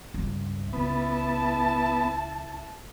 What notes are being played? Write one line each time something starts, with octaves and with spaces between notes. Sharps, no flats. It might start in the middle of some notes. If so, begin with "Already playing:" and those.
C#2 G2
C#2 B3 E4 A5